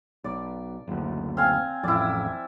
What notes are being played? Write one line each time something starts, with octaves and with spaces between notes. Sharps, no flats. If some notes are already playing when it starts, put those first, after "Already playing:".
B1 D5
F#1 D2
C4 F5 G#5
A1 F2 E4 D5